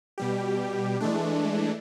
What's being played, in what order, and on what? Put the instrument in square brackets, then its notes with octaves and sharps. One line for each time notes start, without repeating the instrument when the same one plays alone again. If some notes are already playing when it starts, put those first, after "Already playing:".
[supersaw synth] B2 G3 G4
E3 G#3 A3 D4